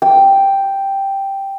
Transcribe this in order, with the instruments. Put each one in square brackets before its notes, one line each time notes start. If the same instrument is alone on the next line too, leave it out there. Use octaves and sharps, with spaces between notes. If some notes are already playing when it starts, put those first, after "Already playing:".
[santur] G5